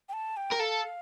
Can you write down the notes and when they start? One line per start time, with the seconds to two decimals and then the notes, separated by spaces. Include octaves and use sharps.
0.09 G5
0.13 A5
0.37 G5
0.52 A#4
0.59 A4 F5